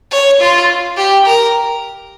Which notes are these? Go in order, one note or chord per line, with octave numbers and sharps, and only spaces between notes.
C#5
F4
G4
A#4